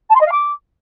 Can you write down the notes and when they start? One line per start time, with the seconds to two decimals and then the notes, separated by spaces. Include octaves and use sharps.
0.09 A5
0.15 C6
0.20 D#5
0.26 F5
0.31 D6